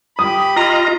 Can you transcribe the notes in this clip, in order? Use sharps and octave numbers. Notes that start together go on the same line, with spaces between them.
G4 B5 D#6
F4 D#5 A#5